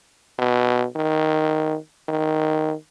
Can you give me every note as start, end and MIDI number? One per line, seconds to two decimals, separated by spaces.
0.39 0.86 47
0.96 1.77 51
2.08 2.74 51